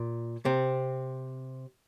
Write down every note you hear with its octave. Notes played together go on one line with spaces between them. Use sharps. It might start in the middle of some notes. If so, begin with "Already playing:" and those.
Already playing: A#2
C3 C4